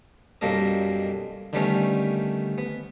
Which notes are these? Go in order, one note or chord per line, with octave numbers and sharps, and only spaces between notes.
B1 F#2 G3 A#3 A4 D#5
D3 D#3 G3 A3 B3 C#4
B3